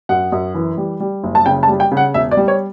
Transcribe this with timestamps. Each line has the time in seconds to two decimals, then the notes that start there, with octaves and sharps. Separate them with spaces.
0.09 F#2 F#5
0.32 F#2
0.55 E3
0.77 G3
1.00 G3
1.23 F#1
1.35 A5
1.46 C#3 G5
1.63 A5
1.68 G3
1.80 G5
1.92 C#3
1.97 F#5
2.14 E1 E5
2.31 D5
2.37 G3
2.48 C#5